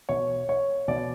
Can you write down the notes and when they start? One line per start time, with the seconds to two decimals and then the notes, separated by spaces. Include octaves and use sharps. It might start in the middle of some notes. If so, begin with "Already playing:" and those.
0.09 B2 C#5
0.49 C#5
0.88 B2 D5